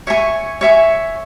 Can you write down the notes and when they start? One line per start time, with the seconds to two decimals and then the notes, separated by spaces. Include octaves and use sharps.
0.07 C#5 E5 G#5 C#6
0.61 C#5 E5 G#5 C#6